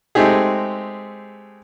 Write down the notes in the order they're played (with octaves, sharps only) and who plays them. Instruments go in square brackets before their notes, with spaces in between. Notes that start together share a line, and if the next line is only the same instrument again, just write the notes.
[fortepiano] G#3 A3 C4 D#4 G4 G#4